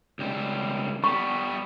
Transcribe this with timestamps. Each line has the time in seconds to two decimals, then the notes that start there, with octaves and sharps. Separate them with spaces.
0.19 C#2 G3
1.04 G3 B3 C#6